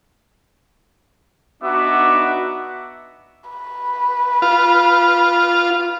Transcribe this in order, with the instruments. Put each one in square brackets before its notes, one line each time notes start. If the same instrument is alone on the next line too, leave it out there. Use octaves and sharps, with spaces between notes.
[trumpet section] B3 D4 D#4 F#4 E5 D6
[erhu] B4
[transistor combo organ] F4